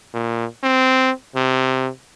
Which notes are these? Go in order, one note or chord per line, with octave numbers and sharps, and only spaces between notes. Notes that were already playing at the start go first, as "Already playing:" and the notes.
A#2
C4
C3